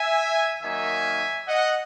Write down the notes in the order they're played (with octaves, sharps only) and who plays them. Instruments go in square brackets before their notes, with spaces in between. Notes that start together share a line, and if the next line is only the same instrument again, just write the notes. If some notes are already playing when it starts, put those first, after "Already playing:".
Already playing: [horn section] E5 G#5
D#3 F#3 A#3 D#4 E5 G#5
D#5 F#5